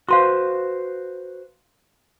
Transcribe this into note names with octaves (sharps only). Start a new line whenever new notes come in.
F#4 B4 C5 F5 C6 C#6